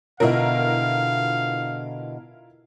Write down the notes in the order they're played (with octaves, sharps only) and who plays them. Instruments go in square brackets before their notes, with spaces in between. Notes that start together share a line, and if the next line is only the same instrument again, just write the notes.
[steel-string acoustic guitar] B2 D3 [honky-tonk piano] E4 F4 A#4 [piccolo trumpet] F5